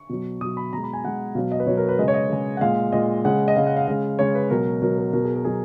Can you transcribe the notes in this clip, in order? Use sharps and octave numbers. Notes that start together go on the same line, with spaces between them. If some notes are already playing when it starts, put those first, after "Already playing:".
Already playing: C#6
B2 F#3
B2 F#3 D#6
B5
B2 G#3 A#5
B5
G#5
B2 G#3 F#5
B2 F#3 F5
D#5
B4
B2 F#3 C#5
A#4
B4
C#3 G#3 D#5
C#5
D#5
C#3 G#3
F#5
A#2 G#3 F5
A#2 G#3 D#5
C#3 G#3 F#5
D#5
C#3 G#3 F5
F#5
F5
C#3 G#3 F5
C#3 G#3 C#5
B4
B2 F#3 A#4
B2 F#3 A#4
A#4
B2 F#3 A#4
G#4
A#4
B2 F#3 G#4